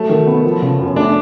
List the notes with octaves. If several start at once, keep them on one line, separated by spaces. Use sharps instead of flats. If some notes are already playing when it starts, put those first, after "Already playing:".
Already playing: F#3 A3
D#3
B3
F3
C#3
F#2
A3 D4